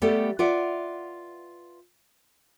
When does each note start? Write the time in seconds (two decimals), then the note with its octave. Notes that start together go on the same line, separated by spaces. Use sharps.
0.02 G3 A3 B3 G4 A4
0.39 F4 B4 D5 E5 F#5